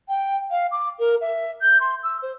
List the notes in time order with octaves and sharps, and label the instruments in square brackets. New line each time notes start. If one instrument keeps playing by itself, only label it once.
[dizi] G5
F5
D6
A#4
E5
G6
C6
E6
C5